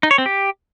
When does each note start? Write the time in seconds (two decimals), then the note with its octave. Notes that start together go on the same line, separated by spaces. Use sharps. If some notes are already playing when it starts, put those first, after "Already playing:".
0.03 D#4
0.11 C#5
0.18 C4
0.26 G4